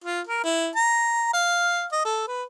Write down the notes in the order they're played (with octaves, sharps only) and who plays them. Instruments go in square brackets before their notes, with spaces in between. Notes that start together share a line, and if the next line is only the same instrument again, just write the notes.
[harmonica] F4
A#4
E4
A#5
F5
D#5
A4
B4